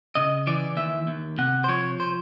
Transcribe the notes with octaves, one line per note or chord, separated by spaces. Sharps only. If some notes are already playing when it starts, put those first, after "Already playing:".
C#3 D#5
E3 D5
D#2 E5
D#2
C3 F#5
C5
F3 C#5
C5